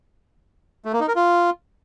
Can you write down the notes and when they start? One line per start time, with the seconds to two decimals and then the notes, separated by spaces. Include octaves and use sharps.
0.85 A3
0.93 A#3
1.00 D#4
1.08 A#4
1.16 F4